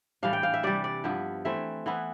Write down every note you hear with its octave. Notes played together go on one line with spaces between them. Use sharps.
A2 E3 G3 D4 F5
G5
F5
E5
C3 E3 G3 D5
D5
G2 F3 B3 E4
E3 A3 C4 E4 E5
E3 B3 E4